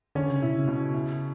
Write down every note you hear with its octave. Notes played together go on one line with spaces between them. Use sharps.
D3 C#4
C#3
B2 E4
C#3
B2
E4